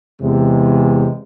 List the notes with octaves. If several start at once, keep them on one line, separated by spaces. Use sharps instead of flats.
E2 C3 G#3